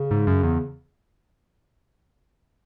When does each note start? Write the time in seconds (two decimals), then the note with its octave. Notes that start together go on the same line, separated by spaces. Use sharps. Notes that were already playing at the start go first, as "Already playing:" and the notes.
Already playing: C#3
0.11 G#2
0.27 F#2
0.43 E2